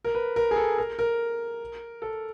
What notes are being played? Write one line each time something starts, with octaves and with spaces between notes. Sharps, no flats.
A#4
B4
A#4
G#4
A4
A#4
A#4
A4